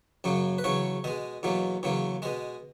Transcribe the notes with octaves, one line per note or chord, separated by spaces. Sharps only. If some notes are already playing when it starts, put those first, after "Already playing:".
F#2 C#3 F#3 A#3
B4
E2 C#3 F#3 C#5
B2 G#3 D#5
E2 B2 F#3 A#3
E2 C#3 F#3 A#3
B2 G#3 D#5